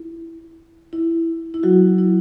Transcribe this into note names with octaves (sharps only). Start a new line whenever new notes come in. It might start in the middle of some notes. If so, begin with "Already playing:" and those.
Already playing: E4
E4
E4
F#3 F#4
E4